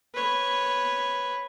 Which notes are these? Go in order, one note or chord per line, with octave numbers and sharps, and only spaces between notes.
B4 C#5